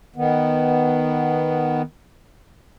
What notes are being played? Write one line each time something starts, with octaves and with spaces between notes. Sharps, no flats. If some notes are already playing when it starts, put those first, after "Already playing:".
D#3 B3